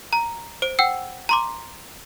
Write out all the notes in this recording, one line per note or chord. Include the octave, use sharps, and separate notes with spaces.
A#5
C5 D7
F#5 G5 E6
A#5 C6 D6